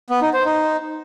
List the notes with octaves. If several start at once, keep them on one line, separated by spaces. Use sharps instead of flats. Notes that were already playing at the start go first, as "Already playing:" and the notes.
B3
D#4
C5
D#4